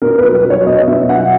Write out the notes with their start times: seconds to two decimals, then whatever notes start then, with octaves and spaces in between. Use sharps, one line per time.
0.02 B2 A#4
0.18 B4
0.24 F#3
0.34 B4
0.45 F#3
0.50 C#5
0.67 B2 D#5
0.88 B2 E5
1.09 F#3 F#5